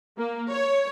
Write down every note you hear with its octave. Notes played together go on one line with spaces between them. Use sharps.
A#3
C#5